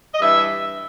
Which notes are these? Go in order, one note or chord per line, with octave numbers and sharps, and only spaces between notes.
D#5
G2 E3 G3 E5